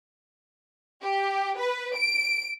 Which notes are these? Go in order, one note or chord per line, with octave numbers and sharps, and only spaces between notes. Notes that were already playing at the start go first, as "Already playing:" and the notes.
G4
B4
D7